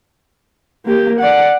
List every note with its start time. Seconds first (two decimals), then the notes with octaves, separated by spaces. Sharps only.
0.86 A#3 G4
1.20 D5 F#5